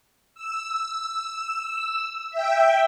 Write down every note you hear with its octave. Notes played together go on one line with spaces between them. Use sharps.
E6
E5 G5